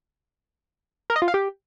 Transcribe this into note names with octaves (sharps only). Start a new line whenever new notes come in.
A#4
D#5
F4
F5
G4